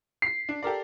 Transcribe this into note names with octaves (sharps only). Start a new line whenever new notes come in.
B6 C7
D4
G4 A4 A#4 D5